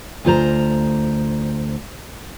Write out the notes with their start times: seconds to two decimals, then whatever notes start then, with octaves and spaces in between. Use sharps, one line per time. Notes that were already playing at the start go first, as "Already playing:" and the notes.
0.25 D2 F4 C5 A#5